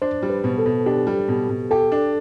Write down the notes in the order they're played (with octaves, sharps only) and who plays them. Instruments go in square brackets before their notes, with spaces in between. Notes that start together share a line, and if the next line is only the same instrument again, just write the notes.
[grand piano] D4 [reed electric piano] C5
[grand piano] G3
[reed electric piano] B4
[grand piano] B2
[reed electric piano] A4
[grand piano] B2
[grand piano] D4 [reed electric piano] G4
[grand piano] G3
B2
B2
[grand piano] G4 [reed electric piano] A4
[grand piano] D4